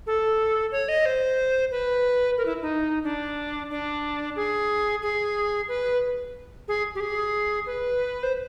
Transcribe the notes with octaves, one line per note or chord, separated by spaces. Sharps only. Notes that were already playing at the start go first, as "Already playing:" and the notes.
A4
C#5
D#5
C5
B4
A#4
E4
D#4
D4
D4
G#4
G#4
B4
G#4
G4
G#4
B4
C5